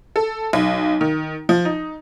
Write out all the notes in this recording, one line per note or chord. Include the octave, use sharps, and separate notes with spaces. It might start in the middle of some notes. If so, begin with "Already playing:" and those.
A4
B1
D#3
F3
D#4